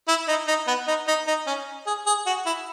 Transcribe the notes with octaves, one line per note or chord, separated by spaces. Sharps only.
E4
D#4
D#4
B3
D#4
D#4
D#4
C#4
G#4
G#4
F#4
E4